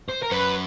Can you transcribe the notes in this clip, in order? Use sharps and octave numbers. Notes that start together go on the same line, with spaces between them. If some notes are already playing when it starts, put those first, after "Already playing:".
C5
A#4
F#2 B4